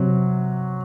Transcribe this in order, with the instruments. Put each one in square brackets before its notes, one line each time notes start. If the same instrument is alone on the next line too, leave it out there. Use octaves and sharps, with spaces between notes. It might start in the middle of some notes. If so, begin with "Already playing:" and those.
Already playing: [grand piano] C3 F#3